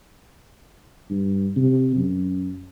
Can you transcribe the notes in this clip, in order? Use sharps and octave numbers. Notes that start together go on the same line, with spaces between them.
G2
C3
F#2